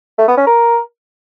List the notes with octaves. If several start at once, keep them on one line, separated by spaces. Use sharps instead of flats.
A3
B3
C#4
A#4